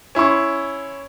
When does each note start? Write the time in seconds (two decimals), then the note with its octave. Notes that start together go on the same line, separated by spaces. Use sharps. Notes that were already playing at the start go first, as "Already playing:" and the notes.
0.15 C#4 E4 C6 C#6